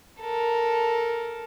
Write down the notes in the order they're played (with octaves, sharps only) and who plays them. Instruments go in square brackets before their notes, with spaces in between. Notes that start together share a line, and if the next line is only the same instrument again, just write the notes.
[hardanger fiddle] A4 A#4